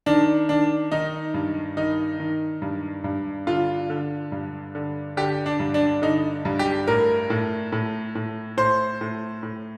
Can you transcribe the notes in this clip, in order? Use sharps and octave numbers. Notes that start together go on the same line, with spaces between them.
D#3 D4
D#3 D4
D#3 D#4
G2
D#3 D#4
D#3
G2
G2
D3 F4
D3
G2
D3
D3 G4
D4
G2
D4
D3 D#4
G2
G4
A2 A#4
A2
A2
A2
A2 C5
A2
A2